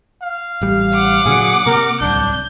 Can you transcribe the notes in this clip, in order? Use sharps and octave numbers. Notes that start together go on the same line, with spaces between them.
F5
A1 G3
F#5 D6
A#2 D3 F#3 G#4
C3 A#3 A#4
D1 G1 C2 D4 G6